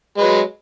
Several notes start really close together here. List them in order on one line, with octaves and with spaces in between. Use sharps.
G#3 B4 F#3